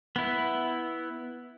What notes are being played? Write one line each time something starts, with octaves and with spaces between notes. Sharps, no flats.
B3 E4